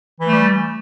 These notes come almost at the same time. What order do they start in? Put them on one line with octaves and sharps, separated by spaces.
E3 A3 G3